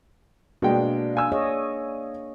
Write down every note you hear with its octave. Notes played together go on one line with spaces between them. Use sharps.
B2 G#3 A#3 D4 G5
F5 G#5 E6
G#4 C#5 D#5